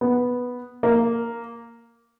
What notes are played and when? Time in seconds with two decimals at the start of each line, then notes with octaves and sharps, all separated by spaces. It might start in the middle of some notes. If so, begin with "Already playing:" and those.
0.01 B3
0.83 A#3